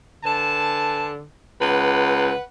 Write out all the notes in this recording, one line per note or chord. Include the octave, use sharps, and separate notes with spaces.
D3 B4 G#5 A5
C#2 B4 F#5